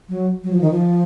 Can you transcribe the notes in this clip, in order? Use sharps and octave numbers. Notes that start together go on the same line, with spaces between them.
F#3
F#3
F3
D#3
F3